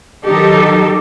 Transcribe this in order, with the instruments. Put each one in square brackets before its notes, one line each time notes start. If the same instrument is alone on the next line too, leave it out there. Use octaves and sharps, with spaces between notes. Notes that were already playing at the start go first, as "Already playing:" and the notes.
[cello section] D#3 F#3 D#4 G4 A4